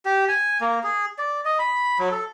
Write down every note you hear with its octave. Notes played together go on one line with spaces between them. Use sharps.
G4
G#5
A#3
G#4
D5
D#5
B5
F#3
A4